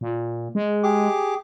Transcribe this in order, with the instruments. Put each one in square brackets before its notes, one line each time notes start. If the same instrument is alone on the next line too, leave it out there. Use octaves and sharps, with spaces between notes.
[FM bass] A#2
G#3
[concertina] G4 G#4 D6